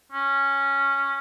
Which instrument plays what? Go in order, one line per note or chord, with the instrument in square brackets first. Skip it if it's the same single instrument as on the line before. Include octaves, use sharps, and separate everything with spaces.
[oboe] C#4